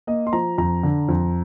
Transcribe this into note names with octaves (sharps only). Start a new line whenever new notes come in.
A#3 D#5
C6
F3 A#5
F2 A#5
D3
F2